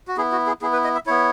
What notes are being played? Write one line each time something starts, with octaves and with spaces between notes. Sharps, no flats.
F#4
B3 E4 G#4
F#4
G#4
B3 E4 G#4
B4
D#5
E5
B3 E4 C#5